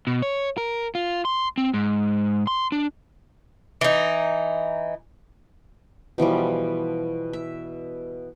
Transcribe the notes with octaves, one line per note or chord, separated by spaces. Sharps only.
B2
C#5
A#4
F4
C6
C4
G#2
C6
D4
E3 D#4
B2 E3 F3 G3
E5